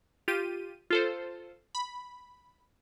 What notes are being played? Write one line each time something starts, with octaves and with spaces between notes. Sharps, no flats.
F4 G4 D#7
F4 A4 C5
B5